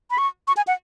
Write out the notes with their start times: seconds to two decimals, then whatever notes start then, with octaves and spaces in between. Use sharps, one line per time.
0.11 B5
0.18 C#6
0.47 C#6
0.57 G#5
0.67 F#5